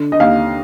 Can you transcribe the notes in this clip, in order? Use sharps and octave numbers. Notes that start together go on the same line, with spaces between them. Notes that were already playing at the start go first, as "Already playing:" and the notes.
Already playing: D3
D#5
D#2 F5